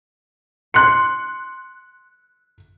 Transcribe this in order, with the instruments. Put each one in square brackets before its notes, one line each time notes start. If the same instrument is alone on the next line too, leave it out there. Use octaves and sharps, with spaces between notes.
[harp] C6 [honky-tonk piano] F#6 C#7